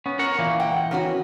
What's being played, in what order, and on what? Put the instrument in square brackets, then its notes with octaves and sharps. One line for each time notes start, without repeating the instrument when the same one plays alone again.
[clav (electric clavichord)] B3 [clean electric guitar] C#4
[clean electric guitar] A#4 C#5 F#5
[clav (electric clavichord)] A#2 A#3 [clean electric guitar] E3
[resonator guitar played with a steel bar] F#5 G5
[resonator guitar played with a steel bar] B3 C#4 F#4 [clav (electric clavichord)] A#4